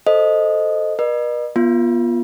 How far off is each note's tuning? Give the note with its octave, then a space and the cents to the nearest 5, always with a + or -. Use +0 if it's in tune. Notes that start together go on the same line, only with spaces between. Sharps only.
A4 +5 C5 +0 D#5 +0
B4 -45 D#5 -45
B3 -30 F4 -5